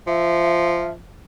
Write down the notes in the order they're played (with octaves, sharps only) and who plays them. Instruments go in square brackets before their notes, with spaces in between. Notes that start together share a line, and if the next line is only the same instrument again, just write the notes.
[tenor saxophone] F3 [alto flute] E5